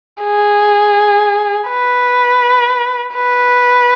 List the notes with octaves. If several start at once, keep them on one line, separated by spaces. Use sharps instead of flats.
G#4
B4
B4